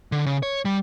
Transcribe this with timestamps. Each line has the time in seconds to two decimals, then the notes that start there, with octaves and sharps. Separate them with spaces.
0.12 D3
0.26 C#3
0.43 C#5
0.65 G3